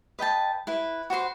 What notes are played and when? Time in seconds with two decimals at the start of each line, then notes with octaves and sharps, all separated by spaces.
0.19 B4 D#5 G5 A5
0.67 E4 B4
1.10 F#4 B4 C5 C6